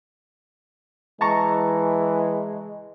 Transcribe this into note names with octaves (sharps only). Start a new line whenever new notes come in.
E3 G#3 A5 A#5 C#6